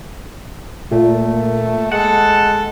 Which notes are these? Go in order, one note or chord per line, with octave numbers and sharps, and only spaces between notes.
A#2 A3
G#3 A4 F#5